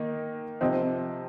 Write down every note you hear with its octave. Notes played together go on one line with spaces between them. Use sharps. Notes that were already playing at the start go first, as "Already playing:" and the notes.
Already playing: D#3 A#3 D#4
C3 F3 C4 D#4